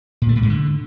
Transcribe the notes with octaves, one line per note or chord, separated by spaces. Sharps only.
A#2
A3
A2
G#2
D3